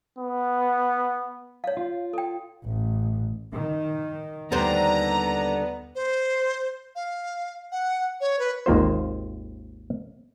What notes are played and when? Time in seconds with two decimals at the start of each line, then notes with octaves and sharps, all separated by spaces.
0.19 B3
1.64 C#5 F5
1.77 F4
2.13 A4 G5
2.65 A1
3.53 D#3
4.52 D#2 D3 G3 B3 C5 A#5
5.95 C5
6.96 F5
7.72 F#5
8.21 C#5
8.39 B4
8.66 G#1 D#2 A#3 F4 C5